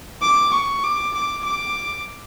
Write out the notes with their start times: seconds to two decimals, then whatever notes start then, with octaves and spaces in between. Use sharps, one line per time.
0.22 D6
0.53 C#6
0.84 D6
1.15 D6
1.45 D6